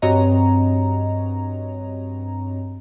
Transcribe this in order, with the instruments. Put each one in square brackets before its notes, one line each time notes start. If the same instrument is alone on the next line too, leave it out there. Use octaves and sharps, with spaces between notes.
[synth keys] G2 C4 F#4 C#5 D#5 A#5